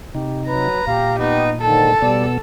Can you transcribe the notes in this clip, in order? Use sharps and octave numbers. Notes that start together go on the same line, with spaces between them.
C3 D#4 G4
F#3 B4 A#5
A#2 G4 F5
B3 D#4
G#2 D3 D#3 A4 A5
B2 G3 B3 D5 E6